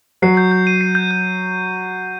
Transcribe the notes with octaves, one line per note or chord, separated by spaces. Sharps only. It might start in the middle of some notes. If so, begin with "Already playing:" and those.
F#3 C7
G6
G6
D#7
C7
G6
G6